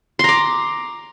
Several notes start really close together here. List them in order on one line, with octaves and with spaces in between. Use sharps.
C6 A#5 D6